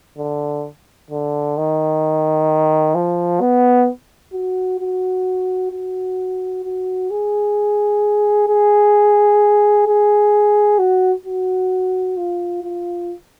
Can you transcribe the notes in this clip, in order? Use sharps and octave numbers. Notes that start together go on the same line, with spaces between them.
D3
D3
D#3
F3
B3
F#4
F#4
F#4
F#4
G#4
G#4
G#4
F#4
F#4
F4
F4